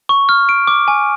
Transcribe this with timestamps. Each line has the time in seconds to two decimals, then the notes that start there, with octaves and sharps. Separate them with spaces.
0.09 C#6
0.29 F6
0.49 D7
0.67 D6
0.88 G#5